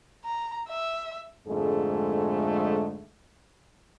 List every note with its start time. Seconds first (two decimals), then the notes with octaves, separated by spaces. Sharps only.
0.25 A#5
0.69 E5
1.47 F2 G#2 D3 G#3 A3 G#4